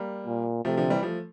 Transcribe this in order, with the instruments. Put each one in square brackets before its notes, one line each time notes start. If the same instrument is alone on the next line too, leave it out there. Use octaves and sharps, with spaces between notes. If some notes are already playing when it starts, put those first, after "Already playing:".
Already playing: [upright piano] G3 A#3
[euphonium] A#2
[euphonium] C3 [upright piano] F3 A3
[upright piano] D3 F3
E3 G3
F3 A3